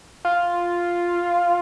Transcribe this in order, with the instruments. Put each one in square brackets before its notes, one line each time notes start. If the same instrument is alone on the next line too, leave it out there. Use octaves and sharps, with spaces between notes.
[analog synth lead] F4